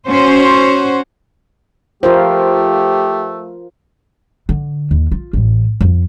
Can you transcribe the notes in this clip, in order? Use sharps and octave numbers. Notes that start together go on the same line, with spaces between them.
C#4 F#4 C5
F3 A3 F4 G4 A#4 C5
D3
D#2
F4
A1 C4
F2